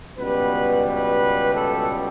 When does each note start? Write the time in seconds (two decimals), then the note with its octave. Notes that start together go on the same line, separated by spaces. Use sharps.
0.18 C#2 B2 G3 B3 B4
0.86 B4
1.54 A4